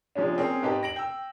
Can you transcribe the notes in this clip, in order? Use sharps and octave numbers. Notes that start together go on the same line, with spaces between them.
C3 F3 G#3 C#4 D4
C4 C#4 G#4 A#4
G#2 G4 B4 D#5 G5 A5
A#6 D7 F#7
G5 E6